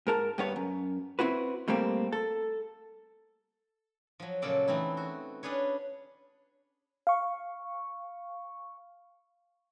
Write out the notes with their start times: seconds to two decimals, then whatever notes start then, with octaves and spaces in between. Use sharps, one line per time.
0.07 G#2 A#4 A5
0.38 G2 B3 C#5
0.56 F#2
1.19 C4 E4 F#4 B4
1.68 B2 G3 A3 A#3 C4
2.12 A4
4.20 F3 F#3
4.42 A#2 C#3 F#3 A4 D5 C6
4.68 E3 A3 C4 D#4 E4
4.97 F#4
5.43 C#4 D4 G#4 B4 C#5
7.07 F5 C#6